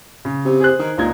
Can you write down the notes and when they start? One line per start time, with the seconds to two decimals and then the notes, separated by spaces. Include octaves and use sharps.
0.25 C#3
0.45 C3
0.60 G#4 C5 F#6
0.79 D#3
0.98 C#2 A#2 D#4 G#6